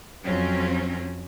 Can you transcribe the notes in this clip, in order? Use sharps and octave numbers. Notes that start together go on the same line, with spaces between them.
F2 F#3 C4 C#4